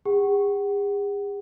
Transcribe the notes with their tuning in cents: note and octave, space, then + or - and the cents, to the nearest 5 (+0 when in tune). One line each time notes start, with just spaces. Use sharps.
G#4 -45 F#5 +30